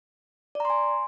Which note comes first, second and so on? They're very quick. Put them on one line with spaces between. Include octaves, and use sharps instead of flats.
D5 A#5 C6 G#5